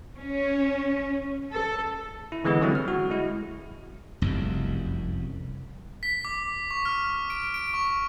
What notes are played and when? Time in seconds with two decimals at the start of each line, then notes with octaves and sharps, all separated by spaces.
0.17 C#4
1.51 A4
2.32 E4
2.44 D3 E3 G#3 B3 G#4
2.61 D3 F#3 G3 C4 E4
2.75 F6
2.88 F#4
3.10 G#3 E4 F#4
4.22 F1 C2 F#2
6.03 B6
6.25 D6
6.71 C#6
6.85 F6
7.30 D7
7.54 D7
7.74 C#6